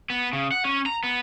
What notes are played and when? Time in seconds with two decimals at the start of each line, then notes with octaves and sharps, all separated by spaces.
0.10 B3
0.33 C#3
0.52 F#5
0.65 C#4
0.86 A#5
1.04 B3